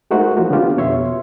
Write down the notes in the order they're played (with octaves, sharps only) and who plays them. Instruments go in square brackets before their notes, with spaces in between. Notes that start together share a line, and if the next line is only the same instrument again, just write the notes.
[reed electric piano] G#3 A3 D#4 F#4 A#4 C5
E3 F3 A#3 F#4
D3 B3 C#4 D4 F4 G4
F2 B2 C#5 E5 C6